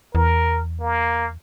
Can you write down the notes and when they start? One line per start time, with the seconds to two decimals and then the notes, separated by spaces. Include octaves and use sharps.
0.15 E2 A#4
0.80 A#3